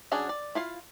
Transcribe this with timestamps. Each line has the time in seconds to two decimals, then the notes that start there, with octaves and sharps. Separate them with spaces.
0.11 F#3 C#4 D4 F#4 G#4
0.29 D5
0.55 E4 F4 F5